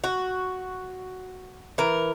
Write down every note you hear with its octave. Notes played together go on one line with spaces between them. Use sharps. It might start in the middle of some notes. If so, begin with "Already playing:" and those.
F#4
E3 A#4